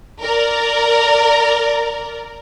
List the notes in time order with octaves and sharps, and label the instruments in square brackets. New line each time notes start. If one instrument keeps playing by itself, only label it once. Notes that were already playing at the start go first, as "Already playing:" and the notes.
[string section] A#4 D5